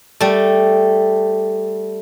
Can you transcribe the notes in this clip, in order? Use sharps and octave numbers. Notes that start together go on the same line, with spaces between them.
G3 A3